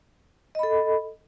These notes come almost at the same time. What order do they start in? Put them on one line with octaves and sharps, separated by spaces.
D#5 B5 A4